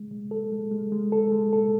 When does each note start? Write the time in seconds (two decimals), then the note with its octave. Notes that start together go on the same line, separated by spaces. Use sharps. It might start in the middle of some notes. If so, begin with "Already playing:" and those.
Already playing: G#3
0.11 G#3
0.31 A4
0.52 G#3
0.72 G#3
0.92 G#3
1.12 A4
1.32 G#3
1.53 A4